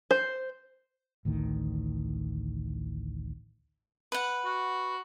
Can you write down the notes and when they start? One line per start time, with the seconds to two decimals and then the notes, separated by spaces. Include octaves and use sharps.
0.11 C5
1.25 A1 D2 A2 D#3
4.12 B4 F#5
4.45 F#4